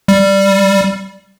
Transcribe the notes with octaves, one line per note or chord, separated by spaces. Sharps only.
G3